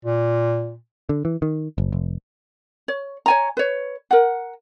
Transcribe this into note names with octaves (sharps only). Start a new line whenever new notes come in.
A#2
D3
E3
D#3
F#1
F1
C#5
C#5 G#5 A#5
B4 C#5
A#4 F#5